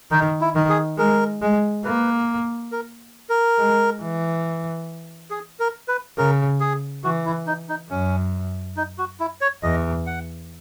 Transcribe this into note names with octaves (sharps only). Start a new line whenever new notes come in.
D#3 D#4
E4
D#3
G#4
G#3 A#4
G#3
A#3 B4
A#4
A#4
G#3
E3
G#4
A#4
B4
C#3 A#4
G#4
E3 F#4
E4
D#4
D#4
F#2 C#4
D#4
F#4
E4
C#5
E2 D#5
F#5